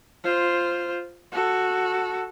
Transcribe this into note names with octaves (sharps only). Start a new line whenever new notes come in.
F4 C5
F#4 A4